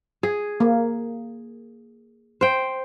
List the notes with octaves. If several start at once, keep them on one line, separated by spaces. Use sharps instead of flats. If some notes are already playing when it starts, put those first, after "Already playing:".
G#4
A#3
C5 G5